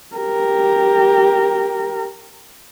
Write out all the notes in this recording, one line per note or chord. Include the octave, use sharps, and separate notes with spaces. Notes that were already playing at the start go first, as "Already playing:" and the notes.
G4 A#4